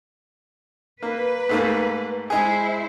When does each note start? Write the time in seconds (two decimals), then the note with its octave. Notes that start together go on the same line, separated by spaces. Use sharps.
1.02 A#3 B4
1.49 G#2 A3 A#3
2.30 G#3 E4 G#4 C5